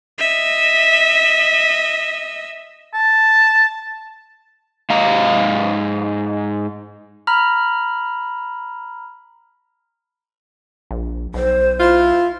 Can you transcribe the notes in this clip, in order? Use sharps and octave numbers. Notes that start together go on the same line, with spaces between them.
D#5 E5
A5
G#2 D#5 F5 A#5
A#5 B5 F6
A#1
B1 C5
E4 F4